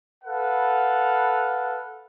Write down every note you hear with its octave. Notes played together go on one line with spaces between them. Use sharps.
A4 B4 F5 F#5